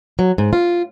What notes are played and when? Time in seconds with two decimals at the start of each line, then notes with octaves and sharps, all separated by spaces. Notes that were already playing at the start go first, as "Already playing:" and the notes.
0.19 F#3
0.38 G#2
0.53 F4